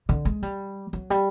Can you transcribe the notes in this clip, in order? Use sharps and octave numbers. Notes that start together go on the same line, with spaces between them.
D3
G#3
G3
F#3
G3